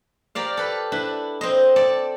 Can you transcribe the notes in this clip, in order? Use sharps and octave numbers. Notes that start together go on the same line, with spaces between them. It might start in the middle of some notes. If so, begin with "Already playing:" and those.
G4 A#4 D5 F5
A4 B4
D4 E4 B4
C4 C5 D#5
A4 D5